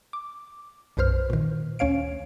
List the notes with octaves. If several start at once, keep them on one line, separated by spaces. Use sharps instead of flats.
D6
B1 F#2 B4 C5 F6
A#2 D#3
D2 C#4 C#5 F5 D7